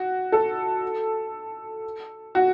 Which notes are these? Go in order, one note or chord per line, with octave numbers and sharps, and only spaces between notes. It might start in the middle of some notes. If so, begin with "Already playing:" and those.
Already playing: F#4
A4
F#4